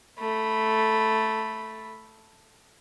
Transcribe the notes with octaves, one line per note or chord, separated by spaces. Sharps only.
A3 B5